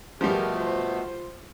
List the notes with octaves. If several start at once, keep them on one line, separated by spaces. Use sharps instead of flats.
B2 F3 G3 A3 B3 G#4 A#4
F4 C5